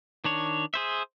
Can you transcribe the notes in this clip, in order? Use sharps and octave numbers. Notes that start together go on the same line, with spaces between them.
D#3 D4 C#5
G#4 C5 E5